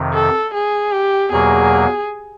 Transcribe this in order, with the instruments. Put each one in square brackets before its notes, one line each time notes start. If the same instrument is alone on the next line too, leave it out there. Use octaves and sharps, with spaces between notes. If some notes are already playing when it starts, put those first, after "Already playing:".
Already playing: [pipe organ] F2 C3 D#3
[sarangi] A4
G#4
G4
[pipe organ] E2 B2 F#3 A#3 [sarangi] G#4